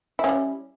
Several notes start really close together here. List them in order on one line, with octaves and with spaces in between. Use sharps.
E4 C#4 G3